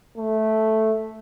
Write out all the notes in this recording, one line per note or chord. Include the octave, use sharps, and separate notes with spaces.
A3